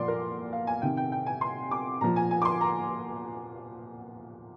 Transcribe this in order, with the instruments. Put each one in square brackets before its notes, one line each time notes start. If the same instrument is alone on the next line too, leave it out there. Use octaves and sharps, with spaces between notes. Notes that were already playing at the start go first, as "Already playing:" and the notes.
Already playing: [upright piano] A#2 F3 D5 C6 D6
A#4
F5
G#5
C3 D#3 G5
G5
G5
G#5
C6
D6
A#2 F3 A#5
G#5
G#5
D6
C6
A#5